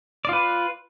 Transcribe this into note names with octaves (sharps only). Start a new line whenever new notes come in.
F4 B4 D5